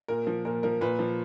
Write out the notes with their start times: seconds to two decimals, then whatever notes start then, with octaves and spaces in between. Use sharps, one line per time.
0.08 A#2 A#4
0.27 F3
0.45 A#2 A#4
0.63 F3 A#4
0.81 A#2 B4
0.99 F3